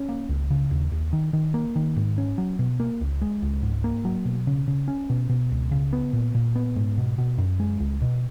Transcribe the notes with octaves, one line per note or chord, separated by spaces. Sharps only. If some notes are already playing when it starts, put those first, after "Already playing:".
Already playing: C#4
A#3
C#2
C#3
D#2
D#2
D#3
D#3
A#3
D#3
G#2
C#4
F#3
B2
A#3
C#2
G#3
C#2
G#2
A#3
F#3
B2
C#3
C#3
C#4
B2
B2
C#2
C#3
B3
A#2
A#2
B3
G#2
B2
B2
F#2
G#3
C#2
B2